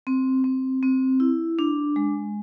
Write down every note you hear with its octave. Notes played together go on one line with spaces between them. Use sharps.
C4
C4
C4
E4
D4
G#3